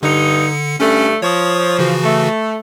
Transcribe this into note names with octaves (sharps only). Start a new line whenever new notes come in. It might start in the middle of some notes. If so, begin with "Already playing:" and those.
G2 D3 D#4 C#7
G2 D3 A3 C#4
F3 C#5 C#6 D#6
C#3 E3 F#4
A3